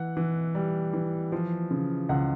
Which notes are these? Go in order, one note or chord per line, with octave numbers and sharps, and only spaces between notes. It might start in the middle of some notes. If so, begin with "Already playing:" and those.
Already playing: E3 F#5
E3
G3
E3
F3
C#3
C#2 F#5